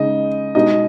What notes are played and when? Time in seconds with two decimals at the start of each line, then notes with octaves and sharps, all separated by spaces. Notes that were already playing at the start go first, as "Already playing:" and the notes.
Already playing: C#3 G#3 D#4 G#4 D#5
0.55 B2 G#3 D#4 D#5